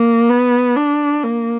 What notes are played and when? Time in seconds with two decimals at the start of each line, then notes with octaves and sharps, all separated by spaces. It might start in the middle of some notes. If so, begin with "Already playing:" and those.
Already playing: A#3
0.30 B3
0.76 D4
1.24 A#3